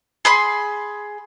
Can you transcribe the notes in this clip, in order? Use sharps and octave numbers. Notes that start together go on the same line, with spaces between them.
G#4 B5 C6